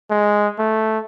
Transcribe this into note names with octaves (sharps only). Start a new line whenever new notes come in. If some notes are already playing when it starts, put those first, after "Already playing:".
G#3
A3